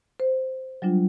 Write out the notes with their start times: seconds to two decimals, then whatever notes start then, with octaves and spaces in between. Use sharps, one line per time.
0.20 C5
0.82 F#3 G3 D4 F4